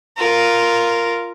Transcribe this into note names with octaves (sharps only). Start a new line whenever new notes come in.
F4 A#4